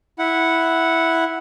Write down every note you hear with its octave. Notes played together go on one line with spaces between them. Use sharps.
E4 F#5